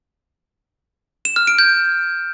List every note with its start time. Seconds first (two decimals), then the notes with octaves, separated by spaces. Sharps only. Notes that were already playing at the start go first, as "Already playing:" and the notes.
1.25 E7
1.36 F6
1.47 D7
1.59 G6